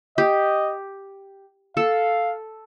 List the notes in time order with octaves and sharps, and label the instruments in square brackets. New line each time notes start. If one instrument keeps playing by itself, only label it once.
[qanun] G4 [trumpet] D#5
[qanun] A4 [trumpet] F5